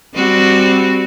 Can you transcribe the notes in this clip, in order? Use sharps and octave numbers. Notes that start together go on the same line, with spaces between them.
G3 C4 F#4